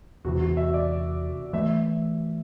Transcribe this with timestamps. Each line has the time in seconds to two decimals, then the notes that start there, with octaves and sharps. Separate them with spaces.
0.25 E2 C3 E3 F#4
0.41 F#4
0.57 E5
0.74 D5
1.53 E3 A3 E5